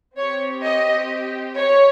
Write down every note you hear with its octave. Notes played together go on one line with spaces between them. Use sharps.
C4 G4 C#5
D#5
C#5